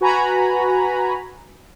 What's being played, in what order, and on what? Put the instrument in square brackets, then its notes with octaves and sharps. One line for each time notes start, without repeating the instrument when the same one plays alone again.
[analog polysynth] F#4 B4 G#5 A#5 B5